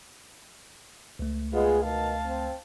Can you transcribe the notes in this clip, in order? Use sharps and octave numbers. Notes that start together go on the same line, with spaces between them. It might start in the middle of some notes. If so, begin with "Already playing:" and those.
C#2 A3
G#3 B3 F4
B2 D#3 F5 A5
C4